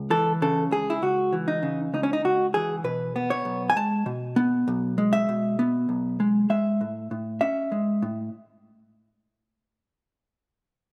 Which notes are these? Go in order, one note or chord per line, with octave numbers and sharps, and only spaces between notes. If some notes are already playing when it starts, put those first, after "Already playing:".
Already playing: C#2
E3 A4
C#3 A4
C#2 G#4
E4
C#2 F#4
E3
D#4
C#3
C#2 D#4
C#4
D#4
C#2 F#4
E3 G#4
B2 B4
B3
C#5
B1
G#5
G#3 A5
B2
B3
B1
G#3
E5
B2
B3
B1
G#3
G#3 E5
A2
A2
C#4 E5
G#3
A2